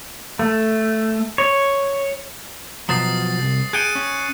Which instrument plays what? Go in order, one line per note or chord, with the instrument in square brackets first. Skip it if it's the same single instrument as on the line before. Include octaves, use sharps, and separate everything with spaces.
[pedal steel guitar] A3
C#5
[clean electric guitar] B2 F3 F#3 [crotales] D#6 A6 C7
[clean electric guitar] C2
[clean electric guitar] G#4 G5 [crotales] F#6 C#7 D#7
[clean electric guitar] C#4